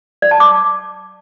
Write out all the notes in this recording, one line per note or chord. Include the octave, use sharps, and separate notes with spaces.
D5
A5
D6